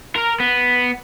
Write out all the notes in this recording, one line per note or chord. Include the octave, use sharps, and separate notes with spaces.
A#4
B3